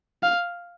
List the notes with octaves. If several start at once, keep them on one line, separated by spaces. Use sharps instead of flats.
F5